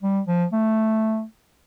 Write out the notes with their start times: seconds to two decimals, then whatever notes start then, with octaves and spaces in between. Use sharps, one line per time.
0.02 G3
0.27 F3
0.53 A3